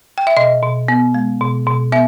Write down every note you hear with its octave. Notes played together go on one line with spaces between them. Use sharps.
G5
E5
B2 D#5
B2
B3
G#3
B2
B2
B3 E5